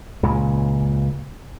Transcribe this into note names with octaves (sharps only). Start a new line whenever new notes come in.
C#2 A#2 C#3